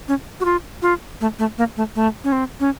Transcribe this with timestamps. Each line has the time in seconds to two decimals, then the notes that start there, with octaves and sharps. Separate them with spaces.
0.08 C#4
0.40 F#4
0.45 F4
0.82 F4
1.21 A3
1.39 A3
1.58 A#3
1.77 A3
1.96 A3
2.24 C#4
2.32 C4
2.60 C#4